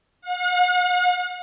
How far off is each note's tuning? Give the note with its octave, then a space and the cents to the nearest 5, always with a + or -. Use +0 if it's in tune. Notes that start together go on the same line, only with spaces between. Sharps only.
F#5 -45